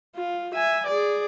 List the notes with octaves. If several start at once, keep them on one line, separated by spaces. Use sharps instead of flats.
F4
E5 G#5
G#4 D5